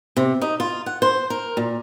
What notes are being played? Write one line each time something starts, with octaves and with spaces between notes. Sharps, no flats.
C3
D#4
F4
F#5
C5
A#4
A#2